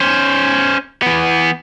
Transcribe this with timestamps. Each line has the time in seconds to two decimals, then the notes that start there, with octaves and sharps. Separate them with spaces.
0.01 C#4 C5
1.03 E3 B3